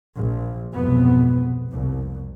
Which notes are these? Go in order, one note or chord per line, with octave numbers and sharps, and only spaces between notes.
A#1
B1 F2 G#2 C3 B3
F1 C2